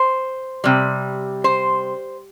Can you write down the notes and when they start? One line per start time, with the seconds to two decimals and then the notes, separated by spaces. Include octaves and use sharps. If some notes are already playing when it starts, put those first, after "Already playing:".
Already playing: C5
0.64 C3 G3
1.44 C5